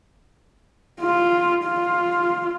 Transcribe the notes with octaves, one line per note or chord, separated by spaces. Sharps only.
F4
F4